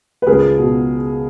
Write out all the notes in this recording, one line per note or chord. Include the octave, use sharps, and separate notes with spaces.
B4
C#2 G#4 A#4
B2